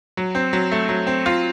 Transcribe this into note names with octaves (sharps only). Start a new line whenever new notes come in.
F#3
C4
F#3
A3
F#3
C4
F4